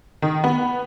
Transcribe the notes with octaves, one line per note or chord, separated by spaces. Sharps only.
D#3
B3